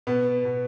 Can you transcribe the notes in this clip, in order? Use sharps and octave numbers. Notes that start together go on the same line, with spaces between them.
B2 B3
B2